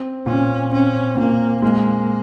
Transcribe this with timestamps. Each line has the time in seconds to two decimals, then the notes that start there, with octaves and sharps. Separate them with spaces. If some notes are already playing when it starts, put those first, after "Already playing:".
Already playing: C4
0.26 A#2 C#4
0.72 C4 C#4
1.17 A#2 A#3
1.62 G#3 A#3